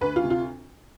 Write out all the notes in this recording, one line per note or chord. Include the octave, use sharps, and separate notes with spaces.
D2 B4
F4
C3
F4